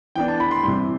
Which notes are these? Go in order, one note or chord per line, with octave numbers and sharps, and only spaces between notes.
E3 B3 D4 G5
A5
B5
C6
C3 E3 G3 C6